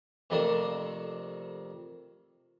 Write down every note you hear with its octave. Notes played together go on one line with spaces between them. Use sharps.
F2 C3 A3 A#3 D4